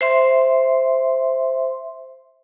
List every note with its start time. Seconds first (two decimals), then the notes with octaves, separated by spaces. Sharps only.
0.01 C5 E5 C6